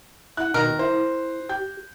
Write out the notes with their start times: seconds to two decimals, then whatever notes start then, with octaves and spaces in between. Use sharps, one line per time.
0.37 E4 F#5 F#6
0.54 B2 D#3 D#4 A#4
0.79 E4 C5
1.49 G4 G6